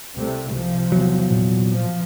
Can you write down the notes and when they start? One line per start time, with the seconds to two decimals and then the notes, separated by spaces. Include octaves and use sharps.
0.15 C2 C3 A3
0.53 C3 F3
0.92 E2 F#3
1.31 A#2
1.73 F3